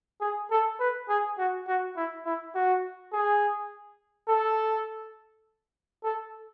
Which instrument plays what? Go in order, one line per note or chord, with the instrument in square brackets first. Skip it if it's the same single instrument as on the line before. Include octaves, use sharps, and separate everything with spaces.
[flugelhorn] G#4
A4
B4
G#4
F#4
F#4
E4
E4
F#4
G#4
A4
A4